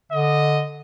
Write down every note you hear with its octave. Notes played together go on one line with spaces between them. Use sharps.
D3 D#5